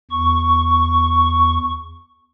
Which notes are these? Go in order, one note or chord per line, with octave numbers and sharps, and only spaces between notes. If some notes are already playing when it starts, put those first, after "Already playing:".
E2 C#6